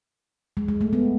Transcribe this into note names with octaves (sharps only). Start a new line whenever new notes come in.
G#3
G#3
A3
B3